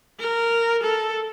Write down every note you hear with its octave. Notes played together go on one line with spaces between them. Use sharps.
A#4
A4